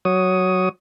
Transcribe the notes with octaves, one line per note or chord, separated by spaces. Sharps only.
F#3 C#5 D#6